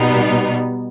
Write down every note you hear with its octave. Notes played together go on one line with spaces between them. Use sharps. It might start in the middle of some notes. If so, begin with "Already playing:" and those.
Already playing: B2 G3 B3 D#4